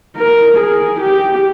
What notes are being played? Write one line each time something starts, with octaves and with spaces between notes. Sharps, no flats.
A#4
G#4
G4